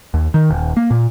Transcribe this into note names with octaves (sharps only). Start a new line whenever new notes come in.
D#2
D#3
D#1
A#3
A#2